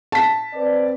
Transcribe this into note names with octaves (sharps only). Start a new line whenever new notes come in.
A5 B6
C4 B4 D5